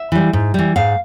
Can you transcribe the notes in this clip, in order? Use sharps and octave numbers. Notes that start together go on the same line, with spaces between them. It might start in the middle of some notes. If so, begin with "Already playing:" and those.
Already playing: E5
E3 G3
G#2
E3 G3
G#2 F5